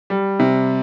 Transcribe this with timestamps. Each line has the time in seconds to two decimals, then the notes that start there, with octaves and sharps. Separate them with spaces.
0.10 G3
0.39 C3